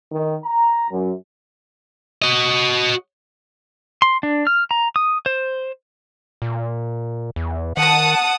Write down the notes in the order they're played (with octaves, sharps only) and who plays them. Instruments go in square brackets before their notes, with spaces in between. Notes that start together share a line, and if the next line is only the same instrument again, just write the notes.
[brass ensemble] D#3
A#5
F#2
[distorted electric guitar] F#4 D#5
[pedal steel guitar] C6
D4
F6
A#5
D#6
C5
[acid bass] A#2
E2
[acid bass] D#3 [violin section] F#5 A5 D#6